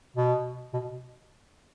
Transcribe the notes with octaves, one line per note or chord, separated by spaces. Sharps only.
B2
B2